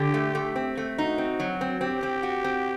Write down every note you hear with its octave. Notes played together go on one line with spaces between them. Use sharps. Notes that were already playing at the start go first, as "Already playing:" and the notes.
Already playing: D3 G4
A3
A3
C4
A3
D#4 F#4
C4
F#3
C4
C4 G4
C4
F#4
C4